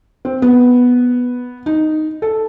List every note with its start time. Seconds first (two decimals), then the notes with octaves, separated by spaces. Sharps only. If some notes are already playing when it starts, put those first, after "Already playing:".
0.25 C4
0.42 B3
1.66 D#4
2.22 A4